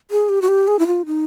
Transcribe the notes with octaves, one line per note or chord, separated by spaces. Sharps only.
G#4
G4
F#4
G4
G#4
E4
F4
D#4